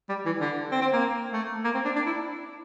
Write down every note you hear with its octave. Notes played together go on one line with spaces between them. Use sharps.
G3
E3
D3
C4
C4
A#3
A3
A#3
C4
D4
D4
E4